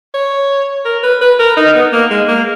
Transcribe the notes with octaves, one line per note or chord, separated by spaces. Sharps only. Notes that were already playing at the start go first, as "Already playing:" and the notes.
C#5
A#4
B4
B4
A#4
D#4
B3
A#3
G#3
A#3